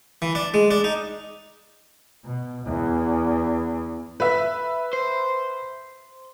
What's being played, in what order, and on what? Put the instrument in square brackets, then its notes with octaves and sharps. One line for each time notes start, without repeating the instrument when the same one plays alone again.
[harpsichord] E3
D4
G#3
D4
D#4
[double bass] B2
E2
[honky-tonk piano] B4 E5
[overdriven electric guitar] C5